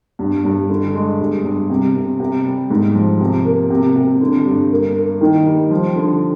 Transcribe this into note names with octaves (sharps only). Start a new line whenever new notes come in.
G2
G2
D3
G#3
G2
G2
C3
C3
C3
G3
G#2
F3
C3
A#3
C3
C3
D3
G2
A#3
A#3
D#3
G3
F3
D3